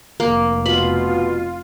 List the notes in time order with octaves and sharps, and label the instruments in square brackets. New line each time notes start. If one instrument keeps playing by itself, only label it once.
[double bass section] F1 [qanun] A#3
[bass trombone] B2 [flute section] F4 [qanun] B5